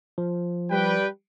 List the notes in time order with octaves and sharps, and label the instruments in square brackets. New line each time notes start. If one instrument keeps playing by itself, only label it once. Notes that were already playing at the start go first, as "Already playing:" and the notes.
[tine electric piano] F3
[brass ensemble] G3 B4 G5